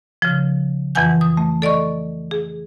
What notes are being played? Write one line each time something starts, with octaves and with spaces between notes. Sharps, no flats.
C#3 F3
F2 E3 B4 F#5 G#5 G6
D#6
A3
A4 D5 D#5 C#6
G#4